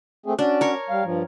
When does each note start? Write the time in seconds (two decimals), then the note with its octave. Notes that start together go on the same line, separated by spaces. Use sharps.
0.26 A3 C4 G#4
0.39 C#4 D4 F#4
0.61 A#4 C#5
0.89 G3 F5
1.04 G2 F3